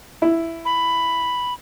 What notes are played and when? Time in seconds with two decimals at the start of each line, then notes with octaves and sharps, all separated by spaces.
0.22 E4
0.65 B5